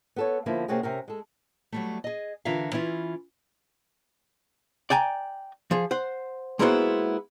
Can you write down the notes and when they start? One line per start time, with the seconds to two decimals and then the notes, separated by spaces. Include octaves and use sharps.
0.16 B3 A4 C#5
0.46 D3 F3 A#3 B3 E4
0.68 C3 A#3 C4 C#4 F#4 G#4
0.83 C3 C#4 A#4
1.08 G#3 A4
1.72 F#3 G3 A3
2.04 G#4 D#5
2.45 D3 E3 F4 A#4 E5 F5
2.72 E3 C#4 E4 F4
4.90 D5 G5 G#5 A#5
5.71 F3 G#4
5.91 C5 F#5
6.59 G#3 A#3 B3 E4 F#4 C5